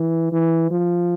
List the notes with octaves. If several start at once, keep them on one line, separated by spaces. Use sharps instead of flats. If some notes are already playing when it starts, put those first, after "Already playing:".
Already playing: E3
E3
F3